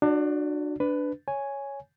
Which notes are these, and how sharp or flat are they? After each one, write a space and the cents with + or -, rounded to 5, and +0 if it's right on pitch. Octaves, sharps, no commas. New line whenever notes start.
D4 +30 F#4 -15 D5 -30
D4 +0 B4 +15
C#5 +0 G#5 +0